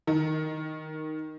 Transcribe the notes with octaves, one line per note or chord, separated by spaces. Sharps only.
D#3